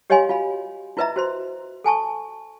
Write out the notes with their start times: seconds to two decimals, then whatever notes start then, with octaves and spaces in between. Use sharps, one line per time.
0.10 G4 C#5 D#5 F5 G#5 C6
0.29 F4 F#4 F5 B5
0.97 E4 F4 B4 D#5 E5 A#5
1.16 F#4 C5 C6
1.84 A4 G#5 A5 C#6